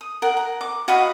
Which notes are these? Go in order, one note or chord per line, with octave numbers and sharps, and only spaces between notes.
D#6
A#4 F#5
A#5
D6
F#4 D#5 F5 B5